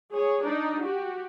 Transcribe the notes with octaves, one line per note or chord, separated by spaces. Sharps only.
G#4 C#5
D4 D#4
F#4 G4